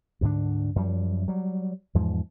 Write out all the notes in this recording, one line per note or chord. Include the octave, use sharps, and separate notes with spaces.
D2 G#2 D3 D4
F#2 F3 G3
F#3 G3
E2 G#2 F3